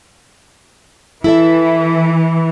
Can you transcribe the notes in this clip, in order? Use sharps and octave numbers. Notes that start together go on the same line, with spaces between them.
E3 E4 A4 E5